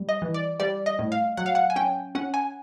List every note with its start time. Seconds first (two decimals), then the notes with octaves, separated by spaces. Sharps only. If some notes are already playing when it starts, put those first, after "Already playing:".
Already playing: G3
0.09 D#5
0.22 E3
0.34 D5
0.60 G3 D5
0.86 D#5
0.99 A2
1.12 F5
1.37 F#3 F#5
1.46 F5
1.55 F#5
1.70 G#5
1.76 C#4 G5
2.15 C#4 F#5
2.34 G#5